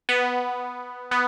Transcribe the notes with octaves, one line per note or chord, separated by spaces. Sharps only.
B3
B3